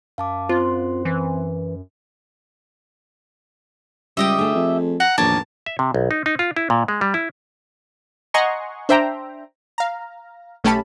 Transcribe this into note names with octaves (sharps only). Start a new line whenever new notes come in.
F#2 F5 A5 D6
C4 F4 C5 C6
E3
C#2 G3 G4 D#5 E5
D2 A3 G#4
F2
F#5 A#5
A#1 E2 A2 D#3 D4 C#5 A5
E5
C3
B1
D#4
D#4
F4
E4
A#2
G#3
G3
E4
D#5 F#5 G#5 A#5 C6 C#6
D4 C5 E5 G5 A#5
F5 A#5
B1 A3 C#4 G4 A5 B5